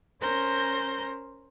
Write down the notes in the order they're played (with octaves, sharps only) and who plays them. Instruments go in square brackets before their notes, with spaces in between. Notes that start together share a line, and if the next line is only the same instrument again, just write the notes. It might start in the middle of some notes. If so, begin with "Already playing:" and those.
[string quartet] C#4 A#4 C5 G6 A#6